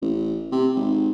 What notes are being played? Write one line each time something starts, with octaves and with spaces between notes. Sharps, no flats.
A1
C3
G#1